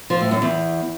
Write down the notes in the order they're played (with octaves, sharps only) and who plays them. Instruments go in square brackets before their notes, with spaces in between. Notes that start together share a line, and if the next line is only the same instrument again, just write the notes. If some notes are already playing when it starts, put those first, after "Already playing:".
[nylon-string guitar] F3
A2
F#2
E2